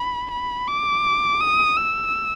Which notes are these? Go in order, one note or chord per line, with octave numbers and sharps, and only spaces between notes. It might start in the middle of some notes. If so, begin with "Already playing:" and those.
Already playing: B5
B5
D6
D#6
E6